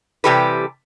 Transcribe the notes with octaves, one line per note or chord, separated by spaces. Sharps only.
C3 E3 G3 G4 A4 B4